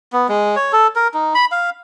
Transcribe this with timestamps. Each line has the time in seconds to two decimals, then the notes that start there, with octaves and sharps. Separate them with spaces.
0.13 B3
0.29 G#3
0.56 C#5
0.73 A4
0.96 A#4
1.14 D#4
1.35 B5
1.52 F5